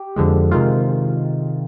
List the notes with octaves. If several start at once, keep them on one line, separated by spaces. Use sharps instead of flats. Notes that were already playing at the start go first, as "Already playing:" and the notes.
Already playing: G4
F2 D3 F3 G#3
C3 D#3 G#3 F4